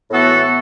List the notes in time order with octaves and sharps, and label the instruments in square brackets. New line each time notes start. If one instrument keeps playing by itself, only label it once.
[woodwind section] A2 E3 B3 F#4 A4